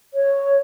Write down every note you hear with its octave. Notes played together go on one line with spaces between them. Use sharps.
C#5